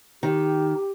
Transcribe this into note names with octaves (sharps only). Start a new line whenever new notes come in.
D#3 G4